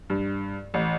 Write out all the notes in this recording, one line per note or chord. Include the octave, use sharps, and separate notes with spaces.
G2
A1